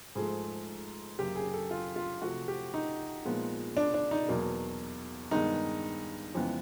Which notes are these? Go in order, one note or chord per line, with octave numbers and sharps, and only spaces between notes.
G#2 F3 A3 G#4
F#2 C#3 F#3 A#3 G4
G#4
A4
F4
F4
C3 F3 A3 F#4
G4
D#4
A#2 F3 G#3 B3
D4
D4
D#4
E2 B2 F#3 A#3
G2 D#3 G#3 B3 D#4
F2 C#3 E3 G#3 B3